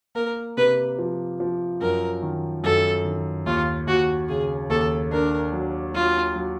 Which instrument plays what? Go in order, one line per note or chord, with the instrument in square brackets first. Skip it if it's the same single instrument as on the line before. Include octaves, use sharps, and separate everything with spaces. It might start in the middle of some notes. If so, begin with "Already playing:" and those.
[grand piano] A#3 [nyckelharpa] A#4
[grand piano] C3 [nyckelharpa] B4
[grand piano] F3
F3
[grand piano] F#2 [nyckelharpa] A#4
[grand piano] D#3
[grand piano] F#2 [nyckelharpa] A4
[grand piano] D#3
[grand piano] D#2 [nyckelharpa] F4
[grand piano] D#2 [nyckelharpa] F#4
[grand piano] C#3 [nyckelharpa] G#4
[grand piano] D#2 [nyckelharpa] A4
[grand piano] D4 [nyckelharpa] A#4
[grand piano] F#3
[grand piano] F#3 [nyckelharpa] F4
[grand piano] F#3